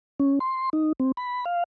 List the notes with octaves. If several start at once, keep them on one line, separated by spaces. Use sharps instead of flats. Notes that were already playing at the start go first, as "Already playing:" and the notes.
C#4
C6
D#4
C4
B5
F5